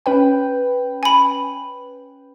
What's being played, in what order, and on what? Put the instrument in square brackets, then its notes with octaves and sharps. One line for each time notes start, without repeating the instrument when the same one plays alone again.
[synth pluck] C#4 B4 G5
[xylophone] G#5 B5